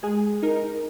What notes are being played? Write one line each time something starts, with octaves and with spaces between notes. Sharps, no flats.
G#3 G#4
D#4 A#4